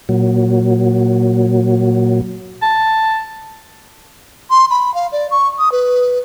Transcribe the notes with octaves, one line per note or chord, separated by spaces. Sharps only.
A#2 F#3
A5
C6
B5
F5
D5
C#6
D#6
B4